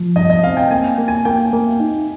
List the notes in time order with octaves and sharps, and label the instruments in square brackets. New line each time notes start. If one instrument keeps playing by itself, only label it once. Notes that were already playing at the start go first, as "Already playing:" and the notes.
Already playing: [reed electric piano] F3
[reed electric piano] G2 [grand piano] D#5
[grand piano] D#5
[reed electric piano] C4 [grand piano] F5
[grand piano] G5
[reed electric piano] A#3 [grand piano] G#5
[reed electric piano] A#3
[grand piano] G#5
[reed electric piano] A#3 [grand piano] G5
[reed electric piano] A#3
D#4